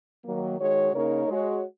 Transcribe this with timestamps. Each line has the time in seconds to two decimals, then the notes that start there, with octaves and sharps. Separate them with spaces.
0.25 D#3 F#3 A#3
0.60 D#3 G#3 F#4 C#5
0.93 C#3 A#3 D#4 A#4 C#5
1.28 G#3 F#4 C#5